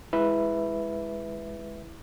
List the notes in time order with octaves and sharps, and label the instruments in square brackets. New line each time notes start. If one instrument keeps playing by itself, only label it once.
[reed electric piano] G#3 B4 E5 [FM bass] E4